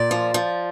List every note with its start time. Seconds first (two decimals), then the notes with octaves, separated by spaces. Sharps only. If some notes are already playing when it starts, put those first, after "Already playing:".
Already playing: A#2 D5
0.11 F3
0.34 F3